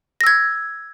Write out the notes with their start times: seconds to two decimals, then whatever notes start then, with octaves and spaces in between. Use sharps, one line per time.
0.21 A#6
0.24 E6
0.27 G#6